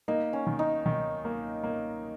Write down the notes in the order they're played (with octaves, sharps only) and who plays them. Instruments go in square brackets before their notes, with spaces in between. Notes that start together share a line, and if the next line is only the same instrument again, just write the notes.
[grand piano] A#3 [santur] D#4
[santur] C#4
[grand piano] D#3
[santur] D#4
[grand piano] D#3
A#3
A#3